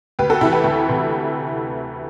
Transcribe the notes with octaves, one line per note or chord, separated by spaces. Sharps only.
D2 G4 B4
F#4 A4
C3 E3 E4 G4
G4 B4
D2 G4 B4
C3 E3